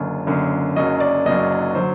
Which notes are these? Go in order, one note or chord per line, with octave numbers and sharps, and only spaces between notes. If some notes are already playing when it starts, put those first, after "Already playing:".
Already playing: F#1 F#2 D3
F#1 F#2 D3
F#1 F#2 F#3 D#5
D5
F#1 F#2 F#3 D#5
D3 F#3 C5